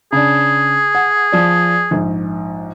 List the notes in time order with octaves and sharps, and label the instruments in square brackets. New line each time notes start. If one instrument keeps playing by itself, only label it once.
[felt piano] C#3 D4 [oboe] G#4
[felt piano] F#5
F3 D5
A#1 G#2